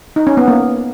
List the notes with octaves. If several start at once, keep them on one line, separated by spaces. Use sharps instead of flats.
D#4
C#4
B3
A#3